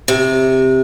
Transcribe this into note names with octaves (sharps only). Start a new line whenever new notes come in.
C3